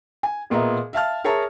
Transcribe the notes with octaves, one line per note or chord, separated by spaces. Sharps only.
G#5
E1 A#2 B3 D#5 E5 A#5
E5 F5 A5 F6
G#4 A#4 C#5 E5 A5 A#5